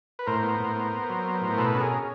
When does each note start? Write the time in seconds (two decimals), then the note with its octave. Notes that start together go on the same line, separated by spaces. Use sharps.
0.19 B4
0.27 A2 A#4 C5
0.43 B3
0.60 A2
0.76 B3
0.93 B3
1.10 F#3
1.25 B3
1.42 A2
1.58 B2 A4 B4
1.75 C#4
1.80 G#4 A#4
1.92 C#4